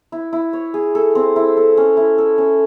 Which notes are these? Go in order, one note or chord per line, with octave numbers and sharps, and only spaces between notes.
E4
E4
C#5
G#4
A4
C4
E4
A4
C#4
E4
A4
C#4